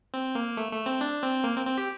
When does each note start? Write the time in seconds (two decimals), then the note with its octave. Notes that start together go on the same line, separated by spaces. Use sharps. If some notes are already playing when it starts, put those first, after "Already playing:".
0.14 C4
0.35 A#3
0.57 A3
0.72 A3
0.86 C4
1.01 D4
1.23 C4
1.44 A#3
1.56 C4
1.66 C4
1.78 G4